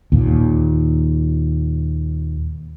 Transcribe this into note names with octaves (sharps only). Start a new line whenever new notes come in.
D#2 A#2